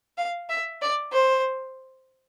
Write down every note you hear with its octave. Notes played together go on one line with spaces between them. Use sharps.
F5
E5
D5
C5